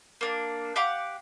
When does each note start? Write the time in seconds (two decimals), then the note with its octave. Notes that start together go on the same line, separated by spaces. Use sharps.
0.21 A#3 D4
0.76 G4 F5 F#5 D6